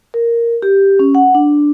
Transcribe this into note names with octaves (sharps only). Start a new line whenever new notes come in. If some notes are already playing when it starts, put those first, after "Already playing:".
A#4
G4
C#4
F#5
D4